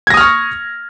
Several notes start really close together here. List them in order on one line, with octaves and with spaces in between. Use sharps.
G#6 A#6 D#6 F6 C#6